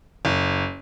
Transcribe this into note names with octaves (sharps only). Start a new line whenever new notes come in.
F#1